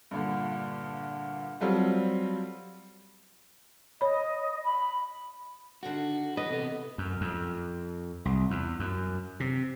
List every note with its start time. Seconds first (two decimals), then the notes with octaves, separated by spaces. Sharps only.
0.11 G2 A#2 D3
1.60 F#3 G3 C4 F4 A4
4.01 C#5 D#5 B5
4.64 B5
5.83 D3 D#3 A3 F#4
6.37 E3 B4 D#5
6.51 C3 B3 A4
6.98 F#2
7.21 F2
8.25 C2
8.50 E2
8.79 F#2
9.40 C3